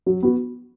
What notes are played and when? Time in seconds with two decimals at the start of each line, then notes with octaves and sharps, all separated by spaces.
0.06 F#3
0.23 B3 F#4